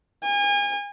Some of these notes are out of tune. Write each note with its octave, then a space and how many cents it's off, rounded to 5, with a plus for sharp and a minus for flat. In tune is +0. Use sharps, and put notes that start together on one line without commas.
G#5 -35